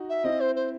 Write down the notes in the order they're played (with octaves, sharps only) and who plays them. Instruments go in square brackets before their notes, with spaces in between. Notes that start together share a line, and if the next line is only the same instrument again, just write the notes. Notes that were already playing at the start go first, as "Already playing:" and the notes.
Already playing: [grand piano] D#4 F#4
[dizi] E5
[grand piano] C4 E4 [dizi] D#5
[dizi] C5
C5